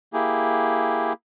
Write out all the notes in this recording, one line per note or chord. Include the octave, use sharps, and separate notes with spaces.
A#3 E4 G4 G#4